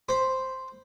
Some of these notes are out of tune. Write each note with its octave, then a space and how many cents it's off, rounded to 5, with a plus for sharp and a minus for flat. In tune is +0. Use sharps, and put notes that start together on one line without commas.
C5 +0 B5 +0